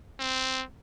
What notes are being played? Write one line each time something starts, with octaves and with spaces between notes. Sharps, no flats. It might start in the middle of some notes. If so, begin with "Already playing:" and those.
C4